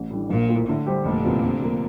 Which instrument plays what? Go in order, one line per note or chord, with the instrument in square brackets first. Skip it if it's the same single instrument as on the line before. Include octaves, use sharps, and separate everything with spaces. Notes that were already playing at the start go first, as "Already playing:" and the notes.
Already playing: [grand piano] A1
A2 G3 D4
[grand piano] A#1 [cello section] A#2
[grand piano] A2 F3 A#3
[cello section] A2 [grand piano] D3
[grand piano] G3 D4 G4 C5
[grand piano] F1 [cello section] A#2 D3
[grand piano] E2 C3 F3
C3
F3 A#3